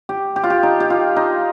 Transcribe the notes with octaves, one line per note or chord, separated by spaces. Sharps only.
G4
G4
F4
G4
D#4
G4
F4
D#4